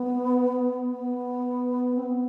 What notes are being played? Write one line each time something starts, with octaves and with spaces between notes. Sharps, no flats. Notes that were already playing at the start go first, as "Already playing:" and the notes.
Already playing: B3
B3
C4
B3